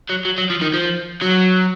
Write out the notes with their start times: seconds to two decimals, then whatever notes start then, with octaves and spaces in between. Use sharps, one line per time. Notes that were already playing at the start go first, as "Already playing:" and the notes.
0.10 F#3
0.25 F#3
0.38 F#3
0.50 F3
0.61 D#3
0.74 F3
1.22 F#3